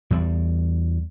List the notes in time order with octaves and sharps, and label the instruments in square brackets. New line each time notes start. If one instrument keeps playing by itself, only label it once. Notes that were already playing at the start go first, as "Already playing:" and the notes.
[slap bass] E2 G3